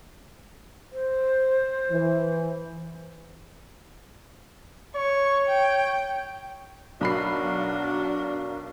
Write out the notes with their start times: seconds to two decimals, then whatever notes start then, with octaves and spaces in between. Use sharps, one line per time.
0.92 C5
1.91 E3
4.96 C#5 C#6
5.47 G5
7.01 B1 D4 F#4 A#4 F5 B5 C7